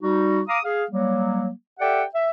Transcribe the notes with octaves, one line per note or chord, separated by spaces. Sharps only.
G3 D#4 F#4
F5 A#5 D6 D#6
G#4 F5
F#3 G3 A#3
G4 A4 D5 E5 F#5 G5
E5